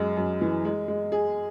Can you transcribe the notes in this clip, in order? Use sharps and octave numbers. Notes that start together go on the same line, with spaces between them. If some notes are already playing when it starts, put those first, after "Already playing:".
Already playing: F#2 G#3
F#2
E3
G#3
G#3
G#4